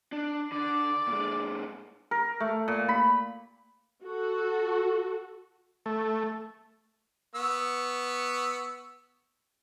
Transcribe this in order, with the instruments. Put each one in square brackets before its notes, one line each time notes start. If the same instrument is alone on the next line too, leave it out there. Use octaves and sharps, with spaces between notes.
[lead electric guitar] D4
[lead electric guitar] D3 [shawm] D5
[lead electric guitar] A#2 G#3
[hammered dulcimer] A#4
A3
A#2
B5
[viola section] F#4 A4
[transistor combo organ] A3
[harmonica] B3 C#6 E6